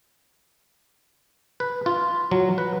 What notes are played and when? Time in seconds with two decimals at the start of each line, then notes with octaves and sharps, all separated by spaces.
1.60 B4
1.86 F4
2.31 F#3
2.58 B4